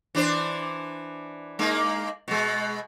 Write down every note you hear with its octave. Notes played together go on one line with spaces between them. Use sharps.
E3 D4 C5
G#3 A#3 D#4
B2 G#3